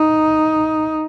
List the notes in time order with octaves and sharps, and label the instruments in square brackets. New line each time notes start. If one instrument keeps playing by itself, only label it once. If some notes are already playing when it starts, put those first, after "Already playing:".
Already playing: [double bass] D#4